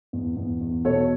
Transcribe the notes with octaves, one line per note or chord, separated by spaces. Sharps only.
E2
E2
E2
B2 A4 C#5